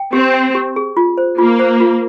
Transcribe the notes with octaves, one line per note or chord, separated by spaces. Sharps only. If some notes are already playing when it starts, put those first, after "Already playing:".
Already playing: G5
C4 G4
G5
G4
G#4
F4
C5
A#3 F4
C5
F4